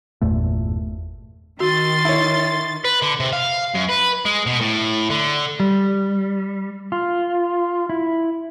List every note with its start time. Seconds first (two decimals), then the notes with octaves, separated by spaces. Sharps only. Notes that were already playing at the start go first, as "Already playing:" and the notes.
0.22 G1 E2 A#2 A3
1.60 D#3 F#4 C6 A6
2.05 E4 C#5
2.84 B4
3.02 D3
3.20 C3
3.33 F5
3.75 F#2
3.89 B4
4.26 G#3
4.46 B2
4.61 A2
5.10 D3
5.60 G3
6.92 F4
7.90 E4